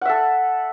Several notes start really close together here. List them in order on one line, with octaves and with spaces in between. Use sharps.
F#5 E5 A4